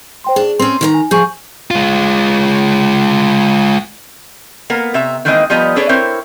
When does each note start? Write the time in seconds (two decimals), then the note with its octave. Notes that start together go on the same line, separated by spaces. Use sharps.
0.24 C5 G5 C6
0.36 D4 G#4
0.59 C4 C#4 C6
0.81 D#3 E5 A#5
0.94 G#5
1.11 F3 G#4 G#5 C#6 G6
1.71 G#3 F4
4.70 A#3 B3 A#4
4.94 C3 E5 A#5
5.25 D#3 E3 G#3 A#3 C4 D#5
5.50 F3 G3 B3 B4 D#5 A#5
5.76 D4 G#4 A4 B4 C#5 D5
5.89 C4 E4 A#4 C5 C#5